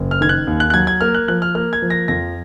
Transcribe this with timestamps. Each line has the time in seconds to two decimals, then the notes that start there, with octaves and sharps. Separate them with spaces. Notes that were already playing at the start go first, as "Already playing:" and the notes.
Already playing: F#1
0.11 F6
0.21 D#3 G#6
0.29 F#6
0.47 D#2
0.60 F#6
0.70 F#6
0.74 F#3 G#6
0.87 G#6
1.01 A#3 F6
1.15 F#6
1.28 F3 F#6
1.42 F6
1.55 A#3 F6
1.73 G#6
1.82 F3
1.90 A#6
2.08 F2 A#6